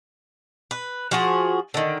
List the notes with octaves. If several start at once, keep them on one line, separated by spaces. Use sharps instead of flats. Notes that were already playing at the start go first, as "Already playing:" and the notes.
B4
F3 F#4 G#4
D3 D#3